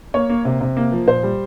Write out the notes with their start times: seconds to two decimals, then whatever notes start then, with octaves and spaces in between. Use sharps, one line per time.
0.14 A#3 C#5
0.30 A#3
0.45 C3
0.61 C3
0.77 A#3
0.92 F3
1.07 A#2 C5
1.23 G3